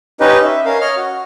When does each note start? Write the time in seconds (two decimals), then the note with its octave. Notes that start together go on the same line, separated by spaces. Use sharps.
0.20 C#4 D#4 G4 B4 D#5
0.45 E5
0.65 C#4 A#4 F5
0.81 C#5 D#5 F6
0.97 F#4